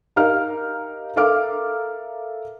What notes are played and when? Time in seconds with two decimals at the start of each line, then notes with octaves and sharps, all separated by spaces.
0.16 D#4 G4 A#4 F5 F6
1.16 A4 A#4 E5 F5 D6 F6